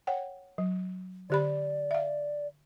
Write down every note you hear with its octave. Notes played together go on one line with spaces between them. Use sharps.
C#5 F#5 G5
F#3
D3 G4 D5 B5
E5 F5